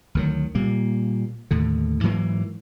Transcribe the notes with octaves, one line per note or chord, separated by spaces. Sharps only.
D2 D#3 F#3
A#2 G3 A#3
D#2 A2 D3
G#2 E3 F#3 A#3